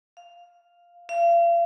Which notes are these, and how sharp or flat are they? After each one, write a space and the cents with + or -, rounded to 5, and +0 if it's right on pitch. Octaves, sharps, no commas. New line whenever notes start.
F5 +0
F5 -40